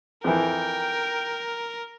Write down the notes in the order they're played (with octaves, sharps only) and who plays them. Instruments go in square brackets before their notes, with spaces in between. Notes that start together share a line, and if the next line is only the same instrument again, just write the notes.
[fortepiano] F2 E3 [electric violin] A#4 [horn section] G5